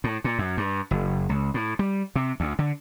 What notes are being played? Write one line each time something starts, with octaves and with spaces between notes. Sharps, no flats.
A2
A#2
F#2
G2
F#1
C#2
A2
G3
C3
D2
D3